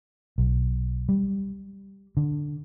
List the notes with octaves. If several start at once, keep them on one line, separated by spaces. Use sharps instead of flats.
B1
G3
D3